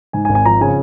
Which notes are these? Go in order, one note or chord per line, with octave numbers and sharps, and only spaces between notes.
G#2 G#5
G#5
G#1
G#5
F3 A#5
C#3 G#5